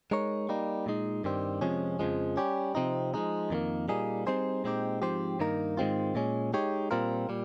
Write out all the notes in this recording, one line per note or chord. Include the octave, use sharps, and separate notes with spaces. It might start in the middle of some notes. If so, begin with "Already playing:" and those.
G#3 D#4 A#4 C#5
G3 A#3 D#4
A#2 G#3 D#4
G2 D#3 G3 C4
F2 C3 F3 G#3 C#4
F2 C#3 F3 G#3
G3 C#4 G4
C3 F3 C4 D#4
F3 G#3 D#4
F2 D#3 G3 A#3
A#2 G3 A#3 D#4 G#4
G3 C4 D#4 G#4 C5
A#2 G#3 C4 D#4 G4
G#2 F3 C4 G4 C5
G2 D#3 A#3 D#4 A#4
G#2 D#3 G#3 C4 F4
A#2 G#3 C#4
G#3 D#4 G4 C#5
A#2 G3 C4 F4 A#4
A#2 G3